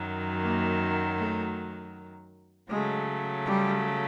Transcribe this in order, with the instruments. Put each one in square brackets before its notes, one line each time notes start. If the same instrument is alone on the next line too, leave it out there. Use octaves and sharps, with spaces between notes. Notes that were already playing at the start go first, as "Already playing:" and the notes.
Already playing: [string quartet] F#2 D#3 F#3
[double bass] A#3
A3
[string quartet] C#3 F#3 A3 [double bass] G#3
[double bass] G3